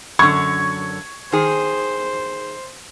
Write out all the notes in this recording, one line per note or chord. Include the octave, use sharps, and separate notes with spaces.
F#2 D3 C#6 G#6
D#3 G#4 C5